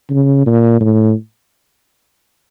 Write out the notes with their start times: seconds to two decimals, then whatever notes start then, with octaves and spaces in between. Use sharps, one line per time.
0.10 C#3
0.47 A#2
0.81 A2